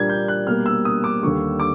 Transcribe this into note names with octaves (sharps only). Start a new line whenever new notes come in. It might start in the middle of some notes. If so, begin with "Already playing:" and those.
Already playing: A#2 G3 A#3 D4 G#6
G6
F#6
B2 G3 A#3 F6
E6
D#6
D6
D#2 D3 G3 C#6
D6